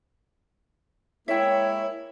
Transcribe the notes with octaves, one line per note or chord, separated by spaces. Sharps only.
G#3 A#3 E4 C#5 E5 G5